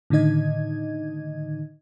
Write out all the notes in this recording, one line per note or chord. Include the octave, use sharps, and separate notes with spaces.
A2 D3 D#3 D#4 D#5 G#6